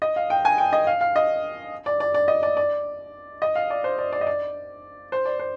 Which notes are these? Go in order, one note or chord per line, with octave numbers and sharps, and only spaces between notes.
D#5
F5
G5
G#5
G5
D#5
F5
F5
D#5
D5
D5
D5
D#5
D5
D5
D#5
F5
D5
C5
D5
D5
D#5
D5
C5
D5
C5